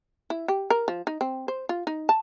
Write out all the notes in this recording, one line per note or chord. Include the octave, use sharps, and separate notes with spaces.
E4
G4
A#4
F3
D#4
C4
C5
F4
D#4
A5